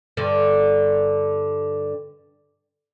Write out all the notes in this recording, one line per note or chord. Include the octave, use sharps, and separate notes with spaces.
G2 D3